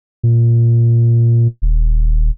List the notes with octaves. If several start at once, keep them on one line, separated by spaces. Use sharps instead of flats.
A#2
D#1